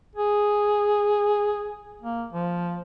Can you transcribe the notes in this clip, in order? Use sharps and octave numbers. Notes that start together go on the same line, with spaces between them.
G#4
A#3
F3